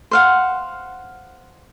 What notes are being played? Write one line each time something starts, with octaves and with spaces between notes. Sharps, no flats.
C5 F5 F#5